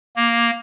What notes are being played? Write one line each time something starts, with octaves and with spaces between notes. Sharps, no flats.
A#3